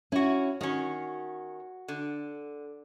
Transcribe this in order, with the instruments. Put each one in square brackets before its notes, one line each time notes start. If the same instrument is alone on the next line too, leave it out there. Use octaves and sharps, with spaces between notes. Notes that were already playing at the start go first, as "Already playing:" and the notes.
[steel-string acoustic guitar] C#4 [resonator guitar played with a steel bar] E4 F#4
[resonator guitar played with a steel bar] D#3 C#4 [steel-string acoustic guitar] F#4
[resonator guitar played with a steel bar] D3